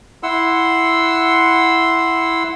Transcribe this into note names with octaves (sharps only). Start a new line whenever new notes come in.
E4 F#5 C6 E6